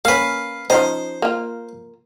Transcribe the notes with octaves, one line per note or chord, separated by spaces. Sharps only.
A#3 C#4 B4 F5
F3 C#4 D#4 C5
A#3 F4